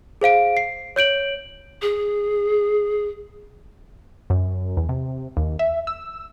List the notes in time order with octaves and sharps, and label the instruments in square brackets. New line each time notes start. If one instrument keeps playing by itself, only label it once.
[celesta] G#4 C5 F5 D7
C7
C#5 G6 D7 F#7
[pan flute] G#4
[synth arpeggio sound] F#2
E2
C3
D#2
E5
E6